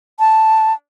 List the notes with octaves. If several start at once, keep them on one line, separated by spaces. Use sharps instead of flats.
A5